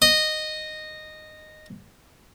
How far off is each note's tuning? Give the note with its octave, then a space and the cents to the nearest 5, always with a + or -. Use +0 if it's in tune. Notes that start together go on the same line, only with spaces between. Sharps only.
D#5 -10